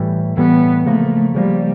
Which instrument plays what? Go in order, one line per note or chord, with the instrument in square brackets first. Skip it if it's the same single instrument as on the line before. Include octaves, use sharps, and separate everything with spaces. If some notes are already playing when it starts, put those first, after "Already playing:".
Already playing: [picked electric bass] A2 E3 G3
[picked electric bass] A2 E3 G3 [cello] B3
[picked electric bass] C#3 F3 A#3 [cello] A3
[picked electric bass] C#3 F3 A#3 [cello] G3